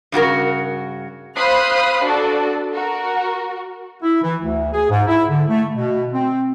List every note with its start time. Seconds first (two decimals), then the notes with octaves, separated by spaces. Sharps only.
0.12 G2 C#3 F#4 A#4
1.36 C5 F5 B5 D#6 F#6 C7
2.05 D4 F#4 A4 D5
2.74 F#4 A#4
4.03 E4
4.23 E3
4.42 D2
4.73 G#4
4.90 G#2
5.07 E4
5.30 D3
5.49 A3
5.75 B2
6.12 C4